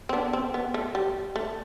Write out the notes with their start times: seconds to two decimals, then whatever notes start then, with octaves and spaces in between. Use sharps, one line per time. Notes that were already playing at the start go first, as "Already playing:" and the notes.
0.09 C4
0.13 B3 D4
0.33 C4
0.54 B3
0.74 A3
0.95 G3
1.36 A3